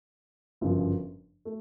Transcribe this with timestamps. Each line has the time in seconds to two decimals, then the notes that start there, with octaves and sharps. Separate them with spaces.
0.61 G1 F#2 C#3 F3
1.45 A3